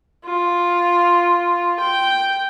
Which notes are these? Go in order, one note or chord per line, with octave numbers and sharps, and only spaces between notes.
F4
G5